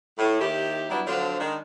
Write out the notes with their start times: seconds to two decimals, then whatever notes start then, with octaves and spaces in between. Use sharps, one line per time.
0.18 A2
0.39 D#2 D#3 E4 G4
0.90 F#3 G3 B3 D4 E4
1.06 D3 F3 F#3 C4 D4 F4
1.38 D#3 G#3 D4